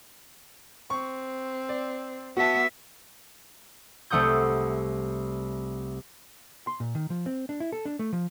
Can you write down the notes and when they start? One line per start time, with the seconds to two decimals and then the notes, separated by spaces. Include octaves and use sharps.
0.90 C4 C#6
1.69 D5
2.37 B3 F#4 E5 A5
4.10 C2 A3 F#5 D#6 G6
6.67 C6
6.80 A#2
6.95 D#3
7.10 F3
7.26 C4
7.49 D4
7.60 E4
7.72 A4
7.85 D4
7.99 A3
8.13 F3